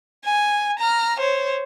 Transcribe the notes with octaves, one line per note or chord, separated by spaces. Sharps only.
G#5
A#5 F6
C5 C#5